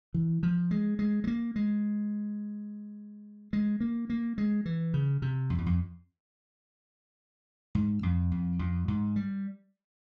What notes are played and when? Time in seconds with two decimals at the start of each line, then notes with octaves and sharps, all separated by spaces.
0.14 E3
0.43 F3
0.71 G#3
0.99 G#3
1.24 G#3
1.27 A#3
1.56 G#3
3.53 G#3
3.80 A#3
4.10 A#3
4.38 G#3
4.65 E3
4.94 C#3
5.22 C3
5.50 F2
5.58 E2
5.66 F2
7.75 G#2
8.03 F2
8.32 F2
8.59 F2
8.88 G#2
9.16 G3